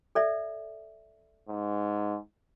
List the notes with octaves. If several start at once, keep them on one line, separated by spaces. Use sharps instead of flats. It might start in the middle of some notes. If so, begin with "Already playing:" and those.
A4 D5 E5
G#2